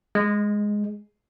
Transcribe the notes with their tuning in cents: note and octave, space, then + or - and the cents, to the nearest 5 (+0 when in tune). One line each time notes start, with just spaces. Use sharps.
G#3 +0